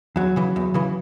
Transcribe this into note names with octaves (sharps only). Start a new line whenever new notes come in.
E2 F#3
C#3 E3
E2
C#3 E3